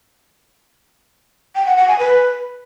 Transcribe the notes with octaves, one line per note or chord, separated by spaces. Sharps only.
G5
F#5
F#5
G#5
B4